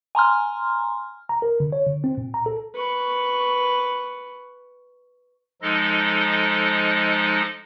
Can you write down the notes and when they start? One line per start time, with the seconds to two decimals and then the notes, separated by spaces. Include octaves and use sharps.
0.15 G#5 A#5 C6 F6
1.29 A#5
1.42 A#4
1.60 D3
1.72 C#5
1.87 D3
2.04 C4
2.18 A#2
2.34 A#5
2.46 A4
2.75 B4 C#6
5.62 F3 G#3 D#4 A4 D#5